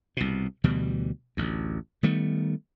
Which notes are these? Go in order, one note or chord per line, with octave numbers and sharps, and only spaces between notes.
C2 B2
D2 B2 E3 G3
A1 D2
D#3 G3 A3 B3